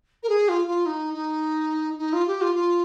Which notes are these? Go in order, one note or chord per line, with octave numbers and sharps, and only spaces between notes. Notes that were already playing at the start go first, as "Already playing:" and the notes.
A#4
G#4
F4
F4
D#4
D#4
D#4
F4
G4
F4
F4